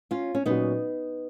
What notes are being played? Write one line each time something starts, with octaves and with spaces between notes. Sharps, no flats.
C#4 F4
C#4
A#2 F#3 B3 C#4 D#4 F#4